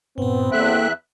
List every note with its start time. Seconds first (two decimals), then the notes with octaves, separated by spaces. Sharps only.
0.18 G2 A#2 B3 C4
0.52 E2 A#3 A4 E5 G5 F#6